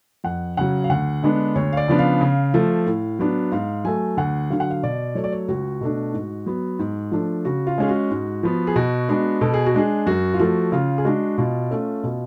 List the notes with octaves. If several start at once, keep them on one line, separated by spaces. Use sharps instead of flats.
F2 F#5
C#3 F#3 F#5
F5
D2 F#5
D3 G#3 B3 D4
D2 C#5
F5
D5
C#3 F3 B3 D4
F5
C#3
F3 A3
A2
F#3 B3 D4
G#2 F5
F#3 A3 G#5
D2 F#5
D3 F#3 F5
F#5
F5
B2 D5
F#3 A3 C#5
D5
C#5
C#2 F#4
B2 A3 D4
G#2
F#3 B3
G#2
F3 A3 D4
C#3 F#4
F4
G#3 C#4 G#4
F#4
G#2
F3 B3
G#4
B2 F#4
G#3 B3 D4
B2 A4
G#4
F#4
G#3 D4 G#4
F#2 F#4
F4
F3 A3 F#4
C#3 F4
G#4
G#3 D4 F#4
B2 F4
A3 C#4
B2